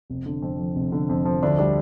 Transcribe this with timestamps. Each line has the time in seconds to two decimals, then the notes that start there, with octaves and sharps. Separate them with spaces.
0.10 F1
0.26 D3
0.42 F2
0.59 F3
0.75 F1
0.92 D3
1.09 F2
1.25 F3
1.43 D2 D4
1.58 G3 D4